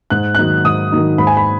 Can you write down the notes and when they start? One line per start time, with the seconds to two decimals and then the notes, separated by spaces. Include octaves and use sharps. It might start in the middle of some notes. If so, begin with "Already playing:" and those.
0.10 G#2 F#6
0.35 D#3 F#3 D#4 F#6
0.64 G#2 D#6
0.92 D#3 F#3 D#4
1.18 G#2 B5
1.27 G#5
1.37 B5